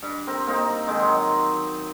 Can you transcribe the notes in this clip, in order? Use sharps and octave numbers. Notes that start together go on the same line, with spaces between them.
G2
C4 A#4
A#3 C4 D#4
D#3 G#3
F#3